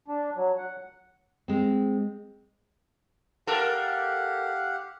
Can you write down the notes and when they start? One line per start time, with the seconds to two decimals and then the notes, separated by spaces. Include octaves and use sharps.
0.08 D4
0.36 F#3
0.58 F#5
1.48 G#3 C4
3.47 G4 A4 A#4 F5 F#5